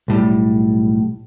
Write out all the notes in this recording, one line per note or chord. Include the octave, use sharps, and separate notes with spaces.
B1 A2 G3